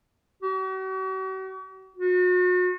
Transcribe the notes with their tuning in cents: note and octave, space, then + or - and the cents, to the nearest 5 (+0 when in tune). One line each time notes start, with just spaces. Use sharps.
F#4 +45
F#4 -35